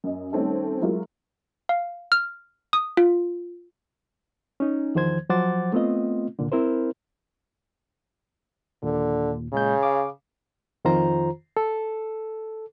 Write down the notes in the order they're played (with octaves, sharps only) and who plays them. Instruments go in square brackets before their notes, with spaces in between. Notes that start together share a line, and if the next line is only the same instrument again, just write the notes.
[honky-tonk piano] F#2 D#5
D#3 G3 A3 C4 C#4 A4
F#3 G#3 E4 F4 A#4
[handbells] F5
F6
D#6
F4
[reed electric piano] C#4 D#4
E2 D#3 F3 C5 G#6
F3 F#3 C5 F#5 D6 A6
A3 B3 C4 F4 D#5
C#2 A#2 D3
C4 E4 A#4 C5
[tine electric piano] D#2 A#2 [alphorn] D3
[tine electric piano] A#2 G#3 G6 [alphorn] C#3
[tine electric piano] F5 D6
[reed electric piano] F2 D#3 F4 C5 A#5
A4